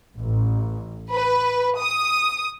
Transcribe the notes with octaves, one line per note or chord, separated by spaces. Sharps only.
A1
B4
D#6